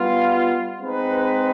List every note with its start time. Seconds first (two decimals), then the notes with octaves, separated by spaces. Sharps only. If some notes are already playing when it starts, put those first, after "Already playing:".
Already playing: G3 B3 F4
0.79 G#3 C4 D#4 B4